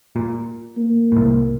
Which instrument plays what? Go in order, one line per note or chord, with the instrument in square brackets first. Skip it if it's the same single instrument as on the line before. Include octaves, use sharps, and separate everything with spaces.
[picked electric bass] A#2
[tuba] A#3
[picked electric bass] C2 A2